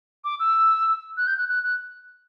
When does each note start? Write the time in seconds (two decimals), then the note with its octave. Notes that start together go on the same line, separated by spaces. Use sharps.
0.24 D6
0.40 E6
1.17 F#6
1.27 G6
1.38 F#6
1.48 F#6
1.63 F#6